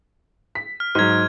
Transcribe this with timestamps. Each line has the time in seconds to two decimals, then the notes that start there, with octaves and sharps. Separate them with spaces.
0.55 B6
0.80 F6
0.95 G#2 F#3 F6 G#6